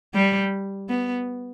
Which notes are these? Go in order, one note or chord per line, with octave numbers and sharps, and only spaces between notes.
G3
B3